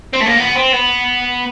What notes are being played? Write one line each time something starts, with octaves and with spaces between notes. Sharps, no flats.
C4
A3
A#3
B3
C4
B3